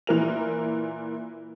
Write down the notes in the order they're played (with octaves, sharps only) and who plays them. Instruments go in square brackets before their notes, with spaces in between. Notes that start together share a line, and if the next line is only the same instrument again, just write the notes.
[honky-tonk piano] A#2 E3 A#4 F7